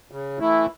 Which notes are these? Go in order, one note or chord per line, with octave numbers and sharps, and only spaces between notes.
C#3
E3 A3 E4